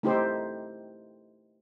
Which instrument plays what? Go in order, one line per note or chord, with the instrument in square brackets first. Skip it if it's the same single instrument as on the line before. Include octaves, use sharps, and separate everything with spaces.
[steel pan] A3 D#4 E4 G4 A4 C5